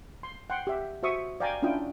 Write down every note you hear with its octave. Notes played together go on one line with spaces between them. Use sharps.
C6
F#5 G5 C6
G4 E5
F#4 C5 E5 C#6 D#6
D5 F5 G5 G#5 A#5 D6
C#4 D4 E4 F4 G5 D#6